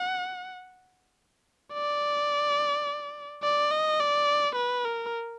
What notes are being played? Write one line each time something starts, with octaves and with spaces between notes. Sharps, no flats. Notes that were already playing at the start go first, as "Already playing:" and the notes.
Already playing: F#5
D5
D5
D#5
D5
B4
A#4